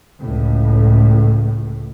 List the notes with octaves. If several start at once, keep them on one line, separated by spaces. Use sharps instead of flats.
C#2 A2